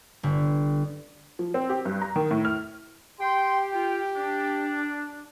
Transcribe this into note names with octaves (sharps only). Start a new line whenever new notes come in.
G1
F3
C4
G4
G2
A#5
D#3
A2
F6
G4 G5 C6
F4 G5
D4